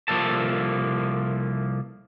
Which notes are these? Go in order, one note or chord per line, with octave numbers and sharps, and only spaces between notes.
C2 C#3 F3 A#3 A4 A5